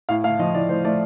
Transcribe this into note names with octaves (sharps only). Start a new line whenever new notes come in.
A2 F5
A3 F5
F3 D#5
A2 D5
A2 C5
A3 D5